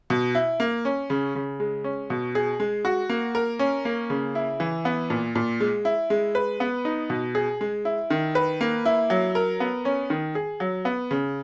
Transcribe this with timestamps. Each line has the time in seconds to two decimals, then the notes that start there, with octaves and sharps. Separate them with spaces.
0.10 B2
0.35 E4
0.60 A#3
0.85 C#4
1.10 C#3
1.35 C#3
1.60 G#3
1.84 C#4
2.10 B2
2.35 G#4
2.60 G#3
2.85 F#4
3.09 A#3
3.35 A#4
3.59 C#4
3.85 A#3
4.10 C#3
4.35 E4
4.60 E3
4.85 B3
5.10 A#2
5.35 A#2
5.60 G#3
5.85 E4
6.10 G#3
6.35 B4
6.60 B3
6.85 D#4
7.10 B2
7.35 G#4
7.61 G#3
7.85 E4
8.10 D#3
8.35 B4
8.61 A#3
8.85 E4
9.10 F#3
9.35 A#4
9.60 B3
9.85 C#4
10.10 D#3
10.35 G#4
10.60 F#3
10.85 B3
11.11 C#3